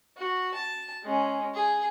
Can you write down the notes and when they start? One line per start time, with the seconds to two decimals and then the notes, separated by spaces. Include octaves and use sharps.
0.17 F#4
0.54 A5
1.04 G#3 C#4
1.54 G#4